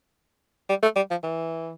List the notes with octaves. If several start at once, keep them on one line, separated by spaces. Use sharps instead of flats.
G3
A3
G3
F3
E3